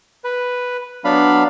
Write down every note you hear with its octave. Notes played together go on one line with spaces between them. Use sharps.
B4
F#3 B3 D4 F5 B5